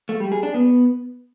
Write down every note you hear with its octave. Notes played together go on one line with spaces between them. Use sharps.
A3
G3
G#4
D4
B3